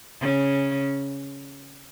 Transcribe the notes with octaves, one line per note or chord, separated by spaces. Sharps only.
C#3 C#4